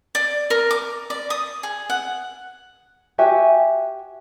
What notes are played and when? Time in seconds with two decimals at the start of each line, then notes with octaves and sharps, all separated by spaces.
0.15 D5
0.50 A#4
0.71 D6
1.10 D5
1.30 D#6
1.63 G#4
1.90 F#5
3.18 F#4 G4 E5 G#5